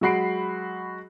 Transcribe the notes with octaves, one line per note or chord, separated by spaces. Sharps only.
F#3 G#3 F#4 B5 C7 D7